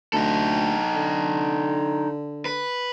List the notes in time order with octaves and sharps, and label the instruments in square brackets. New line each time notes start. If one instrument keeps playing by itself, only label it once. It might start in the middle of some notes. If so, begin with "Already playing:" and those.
[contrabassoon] D2 [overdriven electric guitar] D#4 A4
[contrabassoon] D3
[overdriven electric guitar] B4